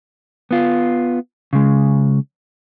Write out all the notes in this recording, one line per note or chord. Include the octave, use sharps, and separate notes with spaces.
B3 F4
C#3 G#3